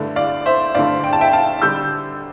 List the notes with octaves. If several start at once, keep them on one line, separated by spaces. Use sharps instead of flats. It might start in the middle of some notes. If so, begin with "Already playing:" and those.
Already playing: G2 D3 A3 D4
D5 F5
C5 E5
G2 D3 A3 D4 D5 F5
G5
A5
E5 G5
F5 A5
D3 G3 D4 E6 G6